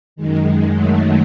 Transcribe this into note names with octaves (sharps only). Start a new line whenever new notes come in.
F#2 D#3 G#3
F#3 A3